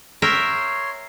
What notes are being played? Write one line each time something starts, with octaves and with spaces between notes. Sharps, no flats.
A#4 C#5 E5 G5 C6